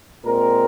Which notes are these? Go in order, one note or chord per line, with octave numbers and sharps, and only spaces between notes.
A#2 G#3 C4 A#4